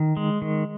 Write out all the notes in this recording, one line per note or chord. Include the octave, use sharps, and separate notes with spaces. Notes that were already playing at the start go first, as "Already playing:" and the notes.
Already playing: D#3
G#3
D#3